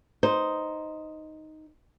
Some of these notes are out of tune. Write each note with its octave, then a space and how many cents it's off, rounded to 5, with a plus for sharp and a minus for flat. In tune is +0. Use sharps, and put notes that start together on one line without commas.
D#4 +0 C5 +0